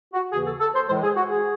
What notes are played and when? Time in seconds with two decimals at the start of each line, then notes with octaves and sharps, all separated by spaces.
0.13 F#4
0.31 D#2 C#3 E3 G#4
0.45 A4
0.60 A4
0.74 C5
0.87 A2 E3 G#3 C5
1.03 G#4
1.16 F#4
1.30 G#4